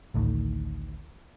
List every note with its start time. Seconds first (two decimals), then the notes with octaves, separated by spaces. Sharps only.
0.14 A1 D2 A2 D#3